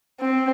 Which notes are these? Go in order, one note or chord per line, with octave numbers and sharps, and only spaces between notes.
C4